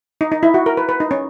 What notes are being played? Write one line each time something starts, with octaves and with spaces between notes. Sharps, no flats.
D#4
D#4
E4
F#4
A#4
B4
B4
D#4
C#4